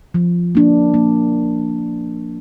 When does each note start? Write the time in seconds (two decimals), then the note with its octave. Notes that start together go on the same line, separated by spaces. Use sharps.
0.14 F3
0.55 A#3 D4
0.94 A#3